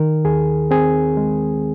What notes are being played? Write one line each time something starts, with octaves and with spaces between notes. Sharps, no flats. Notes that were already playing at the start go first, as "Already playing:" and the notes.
Already playing: D#3 A#4
D#2 G#4
C4 G#4
G#3